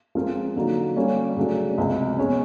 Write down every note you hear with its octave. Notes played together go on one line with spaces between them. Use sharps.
F3 G#3 C4 F4 A#4
D3 F#3 A#3 D#4 F#4
D3 G3 A#3 C#4
C#3 F#3 A3 D4
C#2 C3 F3
B2 G#3 C#4